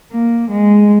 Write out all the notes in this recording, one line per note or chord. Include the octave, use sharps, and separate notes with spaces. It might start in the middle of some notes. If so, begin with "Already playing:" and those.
A#3
G#3